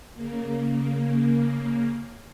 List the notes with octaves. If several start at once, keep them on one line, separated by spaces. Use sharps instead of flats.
C#3 A#3